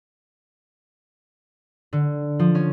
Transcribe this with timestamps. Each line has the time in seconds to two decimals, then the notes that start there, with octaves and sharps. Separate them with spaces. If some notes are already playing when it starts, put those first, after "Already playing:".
1.93 D3
2.39 F3
2.55 C#4